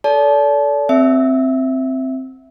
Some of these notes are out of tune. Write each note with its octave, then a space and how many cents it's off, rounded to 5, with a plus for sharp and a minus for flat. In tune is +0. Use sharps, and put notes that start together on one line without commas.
A4 +0 D5 -35 A5 -30
C4 +0 E5 +0 E6 -30